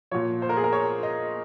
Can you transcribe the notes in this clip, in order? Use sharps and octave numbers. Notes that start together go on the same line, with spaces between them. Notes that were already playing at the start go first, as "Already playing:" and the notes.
A#2 F3 C#5
C5
A#4
G#4
A#4
C#5
D#5